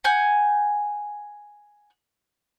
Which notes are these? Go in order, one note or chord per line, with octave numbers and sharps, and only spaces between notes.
F#5 G#5 G6